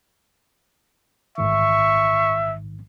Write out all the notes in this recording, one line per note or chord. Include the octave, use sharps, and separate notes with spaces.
A1 G#2 D#3 E5 C#6